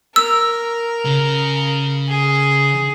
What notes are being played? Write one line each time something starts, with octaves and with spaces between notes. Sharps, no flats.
A#4 E6
C#3
G#4